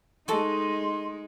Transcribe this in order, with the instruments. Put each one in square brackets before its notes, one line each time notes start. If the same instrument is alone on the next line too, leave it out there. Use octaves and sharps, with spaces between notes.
[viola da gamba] G#3 D#4 [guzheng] F#4 A4 F#5 [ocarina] C6